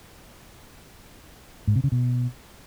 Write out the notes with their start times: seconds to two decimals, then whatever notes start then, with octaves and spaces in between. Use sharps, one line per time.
1.67 G#2
1.76 C3
1.84 C#3
1.92 B2